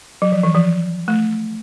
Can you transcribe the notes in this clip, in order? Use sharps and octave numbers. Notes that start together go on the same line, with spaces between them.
F#3
F3
E3
F3
A3